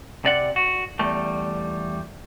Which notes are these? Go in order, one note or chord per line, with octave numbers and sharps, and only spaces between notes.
C3 D5 F#5
F#4
E2 G3 A3